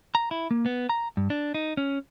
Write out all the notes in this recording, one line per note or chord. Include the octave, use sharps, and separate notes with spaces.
A#5
E4
A#3
B3
A#5
G2
D4
D#4
C#4